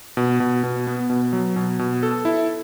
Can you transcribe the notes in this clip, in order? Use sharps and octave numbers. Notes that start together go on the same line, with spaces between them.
B2
B2
B2
B3
B2
F#3
B2
B2
A4
E4